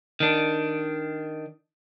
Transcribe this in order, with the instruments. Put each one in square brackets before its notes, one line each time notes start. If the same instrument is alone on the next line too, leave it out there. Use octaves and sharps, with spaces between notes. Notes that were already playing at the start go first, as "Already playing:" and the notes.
[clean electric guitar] D#3 D4